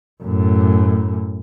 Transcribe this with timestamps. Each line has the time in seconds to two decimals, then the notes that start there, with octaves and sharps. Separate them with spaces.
0.23 F#2 A2